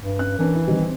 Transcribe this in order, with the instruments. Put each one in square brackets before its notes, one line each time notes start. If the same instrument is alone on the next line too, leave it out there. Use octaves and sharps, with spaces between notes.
[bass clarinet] G2
[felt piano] C#4 F#6
[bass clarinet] E3 [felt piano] C#4 D4 A#4
[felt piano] E4
D#3 G3 C4
C4